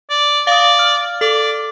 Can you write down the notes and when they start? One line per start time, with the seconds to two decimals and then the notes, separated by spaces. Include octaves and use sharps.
0.10 D5
0.47 D5 F5 D#6
0.79 F6
1.21 A4 D5 D6